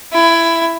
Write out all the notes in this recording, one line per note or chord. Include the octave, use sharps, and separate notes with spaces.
E4